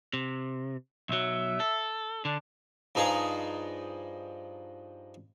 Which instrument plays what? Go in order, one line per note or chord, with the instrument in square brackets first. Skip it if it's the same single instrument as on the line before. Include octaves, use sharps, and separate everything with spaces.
[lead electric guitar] C3
[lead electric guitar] B1 F#3 [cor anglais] E5
[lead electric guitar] A4
[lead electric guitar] D3 [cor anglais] D4
[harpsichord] G2 F3 D#4 G#4 A#5